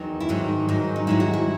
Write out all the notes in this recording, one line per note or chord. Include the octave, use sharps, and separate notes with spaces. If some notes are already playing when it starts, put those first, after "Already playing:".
Already playing: E2 D#3 F#3
E4
G#2 D#3 F#3 D#4
G#2 D#3 F#3
D#4
G#2 D#3 F#3 E4
F#4
E4